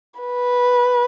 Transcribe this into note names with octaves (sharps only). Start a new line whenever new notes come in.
B4